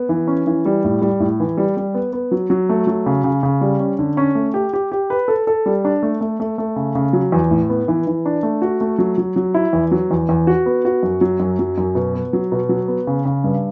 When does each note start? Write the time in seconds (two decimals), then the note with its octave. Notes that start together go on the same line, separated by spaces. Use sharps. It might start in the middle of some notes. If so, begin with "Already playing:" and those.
Already playing: B3
0.09 E3
0.27 C#4
0.47 E3
0.66 G3
0.84 A2
1.02 G3
1.20 A2
1.40 E3
1.57 G3
1.77 G3
1.94 B3
2.13 B3
2.31 F#3
2.50 F#3
2.69 A3
2.87 F#3
3.06 C#3
3.24 C#3
3.43 C#3
3.61 G3
3.80 C#4
3.99 D3
4.17 C#4
4.35 A3
4.54 G4
4.73 G4
4.92 G4
5.10 B4
5.28 A4
5.47 A4
5.66 G3
5.85 D4
6.03 A3
6.21 A3
6.40 A3
6.58 A3
6.76 C#3
6.95 C#3
7.13 F#3
7.32 E2
7.51 A2
7.69 B3
7.88 E3
8.07 E3
8.26 D4
8.43 A3
8.62 F#4
8.81 A3
8.99 F#3
9.18 F#3
9.36 F#3
9.54 E4
9.73 E2
9.91 F#3
10.11 E2
10.29 E2
10.47 F#4
10.66 B3
10.85 F#4
11.03 F#2
11.21 F#3
11.40 F#2
11.59 F#3
11.78 F#2
11.95 B2
12.14 B3
12.33 F#3
12.52 B2
12.69 F#3
12.88 B3
13.07 C#3
13.25 C#3
13.44 G2